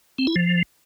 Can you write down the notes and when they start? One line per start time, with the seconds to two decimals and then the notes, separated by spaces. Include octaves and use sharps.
0.18 C4
0.27 E4
0.36 F3